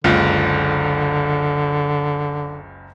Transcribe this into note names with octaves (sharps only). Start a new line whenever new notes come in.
F#1 C#2 D3 F4